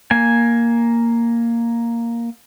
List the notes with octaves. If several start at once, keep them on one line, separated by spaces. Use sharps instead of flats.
A#3 G#5